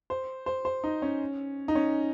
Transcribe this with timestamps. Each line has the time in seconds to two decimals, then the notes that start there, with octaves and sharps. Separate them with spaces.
0.10 C5
0.46 C5
0.65 C5
0.84 D#4
1.02 C#4
1.68 D#4
1.75 C#4